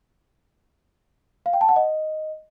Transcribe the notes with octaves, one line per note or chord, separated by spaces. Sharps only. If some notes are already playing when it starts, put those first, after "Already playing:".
F5
G5
A5
F#5
D#5